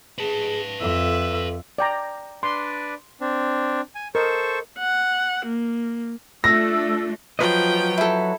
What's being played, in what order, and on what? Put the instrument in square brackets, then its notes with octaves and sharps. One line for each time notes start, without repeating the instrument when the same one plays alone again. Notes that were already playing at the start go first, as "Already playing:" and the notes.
[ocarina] G#4 [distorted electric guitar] B4 A5
[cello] F2 [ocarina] A4 [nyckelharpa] E5
[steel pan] D5 G5 A#5
[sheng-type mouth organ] D4 B4 D5 [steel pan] C6
[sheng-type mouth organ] C4 D4
G#5
[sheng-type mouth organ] A4 C5 C#6 [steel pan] A#4 D#5
[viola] F#5
A#3
[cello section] A3 D4 [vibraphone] F4 [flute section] E6 [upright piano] A#6
[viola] F3 G5 [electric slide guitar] F#3 B4 D#5
[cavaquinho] E4 A4